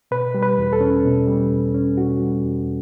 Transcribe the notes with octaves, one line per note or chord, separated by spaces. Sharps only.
B2 B4
G3
B4
E2
A4
C#4
B2
G3
E2
C#4
B2 F#4
G3
E2